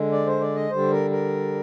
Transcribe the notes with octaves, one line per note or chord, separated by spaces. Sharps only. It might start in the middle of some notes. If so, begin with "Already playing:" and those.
Already playing: D3 G#3
D5
C5
D5
D#5
D3 G3 C5
A#4
A#4